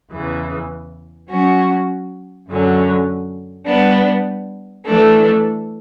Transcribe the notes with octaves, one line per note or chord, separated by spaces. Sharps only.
E2 C#3 E3
F#3 C#4 F#4
F#2 D3 F#3 C#4
G3 B3 D4
E3 A3 D4 A4